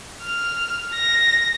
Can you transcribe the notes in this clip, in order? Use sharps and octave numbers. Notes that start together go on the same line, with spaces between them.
F6
A#6